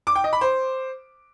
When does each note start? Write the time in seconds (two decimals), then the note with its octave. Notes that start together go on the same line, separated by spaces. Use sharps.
0.07 D6
0.15 G5
0.24 D#5
0.33 B5
0.41 C5